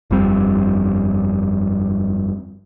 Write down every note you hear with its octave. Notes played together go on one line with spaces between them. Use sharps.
G1 F2 G3 C4